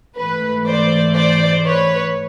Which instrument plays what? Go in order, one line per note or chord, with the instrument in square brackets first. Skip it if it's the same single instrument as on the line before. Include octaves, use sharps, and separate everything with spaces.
[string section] G#2 E3 A3 B4
C5 D5
C5 D5
B4 C#5